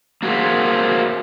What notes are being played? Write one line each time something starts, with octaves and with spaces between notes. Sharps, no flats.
A#3 F#4 G#4 C5 E5